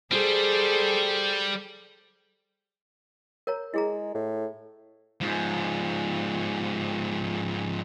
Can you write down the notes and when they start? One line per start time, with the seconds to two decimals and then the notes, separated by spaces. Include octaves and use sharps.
0.11 G3 G#4 A4 C5
3.47 A#4 C#5 A#5
3.74 G#3 E4 G#4 A#5
4.14 A2
5.21 G#2 F3